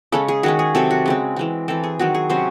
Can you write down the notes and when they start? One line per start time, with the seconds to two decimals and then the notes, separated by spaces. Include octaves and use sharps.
0.12 C#3 G#3 C#4 A4
0.28 G#4
0.43 D#3 G#3 C#4 F#4
0.59 G#4
0.75 C3 F#3 C4 A4
0.91 F#4
1.06 C#3 G#3 C4
1.36 E3 G#3 C4
1.68 E3 C4 A4
1.84 G#4
1.99 D#3 F#3 C4 F#4
2.15 G#4
2.30 C3 F#3 C#4 C5